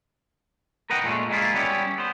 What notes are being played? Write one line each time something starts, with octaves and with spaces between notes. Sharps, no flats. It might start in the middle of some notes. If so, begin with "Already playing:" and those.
A#4 B4 D#5 F#5 G5
A#2 G#3 A3 C#4
G#3 A#3 B3 E4 F4 G#4
G3 B3 C#4 E4 G4
B3 C5